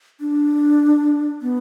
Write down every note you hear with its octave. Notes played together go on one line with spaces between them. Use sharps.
D4
B3